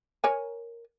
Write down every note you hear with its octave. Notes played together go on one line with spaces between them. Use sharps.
A#4 C#5 G#5